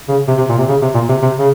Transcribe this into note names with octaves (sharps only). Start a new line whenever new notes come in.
C#3
C3
C3
A#2
C3
C#3
C3
A#2
C3
C3
C#3